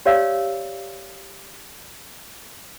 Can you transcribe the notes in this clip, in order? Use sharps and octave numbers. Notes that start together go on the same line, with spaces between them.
G4 C#5 D5 F5 E6